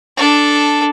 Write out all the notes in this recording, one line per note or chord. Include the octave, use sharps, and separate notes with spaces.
D4 A4